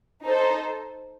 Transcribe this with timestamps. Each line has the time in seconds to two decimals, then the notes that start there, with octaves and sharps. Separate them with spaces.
0.23 D#4 A4 C5